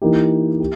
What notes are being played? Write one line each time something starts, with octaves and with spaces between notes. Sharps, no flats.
E3 A#3 D#4 G4
G4